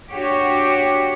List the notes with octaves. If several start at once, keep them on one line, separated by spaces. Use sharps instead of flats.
D4 F#4 G4 C#5